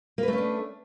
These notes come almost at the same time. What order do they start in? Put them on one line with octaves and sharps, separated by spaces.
A#3 B4 A3 C#4 D4